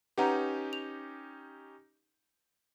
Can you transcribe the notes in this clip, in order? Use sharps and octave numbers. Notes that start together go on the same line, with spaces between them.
C#4 D#4 G4 B4 F#5 A#5
F7